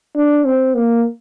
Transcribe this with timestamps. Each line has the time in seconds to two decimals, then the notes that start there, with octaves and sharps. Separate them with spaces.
0.16 D4
0.45 C4
0.75 A#3